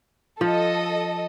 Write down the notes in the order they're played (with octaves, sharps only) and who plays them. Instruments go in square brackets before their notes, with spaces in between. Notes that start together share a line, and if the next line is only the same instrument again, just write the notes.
[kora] F3 [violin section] A4 D#5